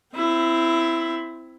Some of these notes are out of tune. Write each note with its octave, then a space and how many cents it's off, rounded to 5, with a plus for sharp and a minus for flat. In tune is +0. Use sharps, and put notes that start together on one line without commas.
C4 -5 E4 +15